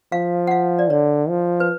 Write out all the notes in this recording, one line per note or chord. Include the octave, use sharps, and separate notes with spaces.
F3 F5
F#5
F5
D5
D3 C#5
F3
B4